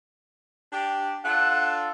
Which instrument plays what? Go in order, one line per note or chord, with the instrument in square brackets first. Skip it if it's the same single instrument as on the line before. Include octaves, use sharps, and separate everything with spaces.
[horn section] D4 G4
[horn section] D4 F4 A4 [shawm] F#5